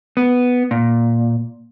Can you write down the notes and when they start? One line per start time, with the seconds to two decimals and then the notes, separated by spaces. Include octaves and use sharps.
0.17 B3
0.71 A#2